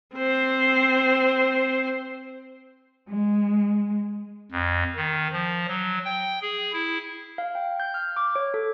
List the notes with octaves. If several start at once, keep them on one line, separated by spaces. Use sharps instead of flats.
C4 C5
G#3
F2
D#3
F3
F#3
G5
G#4
E4
F5
G5
G6
F6
D6
C#5
A4